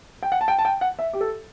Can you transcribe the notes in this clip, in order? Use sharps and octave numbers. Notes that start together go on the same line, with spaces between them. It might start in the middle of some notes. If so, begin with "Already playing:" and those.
G5
F#5
A5
G5
A5
G5
F#5
E5
G4
A4